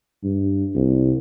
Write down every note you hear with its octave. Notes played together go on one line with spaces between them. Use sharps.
G2
C2